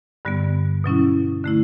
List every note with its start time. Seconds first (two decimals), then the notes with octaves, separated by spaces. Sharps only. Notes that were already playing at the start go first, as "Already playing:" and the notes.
0.25 G2 D3 G3 B3
0.84 B2 F#3 C#4 E4
1.44 D3 A3 E4